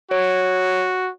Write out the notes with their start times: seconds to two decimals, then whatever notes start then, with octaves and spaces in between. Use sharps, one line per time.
0.11 F#4 C#5